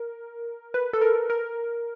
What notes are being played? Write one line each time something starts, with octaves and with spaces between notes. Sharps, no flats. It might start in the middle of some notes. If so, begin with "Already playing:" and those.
Already playing: A#4
B4
A4
A#4
A#4